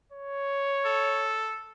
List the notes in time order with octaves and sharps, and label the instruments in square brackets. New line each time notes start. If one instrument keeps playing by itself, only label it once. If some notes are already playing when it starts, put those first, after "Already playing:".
[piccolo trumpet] C#5
[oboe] A4